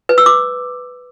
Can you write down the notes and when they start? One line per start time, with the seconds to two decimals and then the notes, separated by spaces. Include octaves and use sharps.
0.09 B4
0.18 E6
0.26 D6